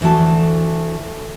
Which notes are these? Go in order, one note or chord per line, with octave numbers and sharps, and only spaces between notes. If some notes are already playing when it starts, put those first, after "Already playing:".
D2 E3 A3 F#4 A5